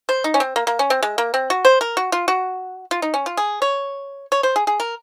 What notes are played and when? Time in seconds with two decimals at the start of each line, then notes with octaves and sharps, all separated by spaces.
0.09 C5
0.24 D#4
0.34 C#4
0.40 C4
0.56 A#3
0.67 A#3
0.79 C#4
0.90 C4
1.03 G#3
1.18 A#3
1.34 C4
1.50 F#4
1.65 C5
1.81 A#4
1.97 F#4
2.12 F4
2.28 F#4
2.91 F4
3.02 D#4
3.14 C#4
3.26 F4
3.37 G#4
3.62 C#5
4.32 C#5
4.43 C5
4.56 G#4
4.67 G#4
4.80 A#4